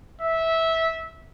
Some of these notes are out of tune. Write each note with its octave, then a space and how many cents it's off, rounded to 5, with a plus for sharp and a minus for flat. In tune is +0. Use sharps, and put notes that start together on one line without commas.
E5 -15